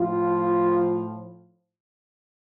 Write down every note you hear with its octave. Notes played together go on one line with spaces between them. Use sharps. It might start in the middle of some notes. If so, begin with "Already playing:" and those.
Already playing: A2 F3 F4